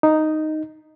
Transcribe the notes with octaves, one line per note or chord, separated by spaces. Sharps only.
D#4